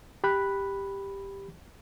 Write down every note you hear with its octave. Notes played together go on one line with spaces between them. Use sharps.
G4 B5 F#6